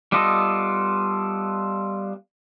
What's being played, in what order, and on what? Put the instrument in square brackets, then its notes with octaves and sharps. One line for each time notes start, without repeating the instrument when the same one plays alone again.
[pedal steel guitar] G3 B3 F4 A4 D#5